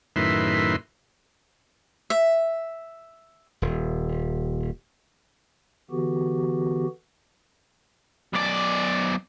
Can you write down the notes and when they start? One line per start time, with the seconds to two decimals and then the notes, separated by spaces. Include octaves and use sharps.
0.16 F#2 A2 D#3 B4 E5 C6
2.10 E5
3.62 D#1
5.90 D3 E3 B3 F#4 G4
8.33 B1 D5